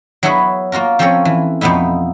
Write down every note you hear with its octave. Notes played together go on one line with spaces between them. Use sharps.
F#3 B3 E4 F#4 G#4 B4
A#3 F4 F#4 A#4
F3 C4 C#4 A4 A#4 C#5
E3
F2 B2 B3 D#4 E4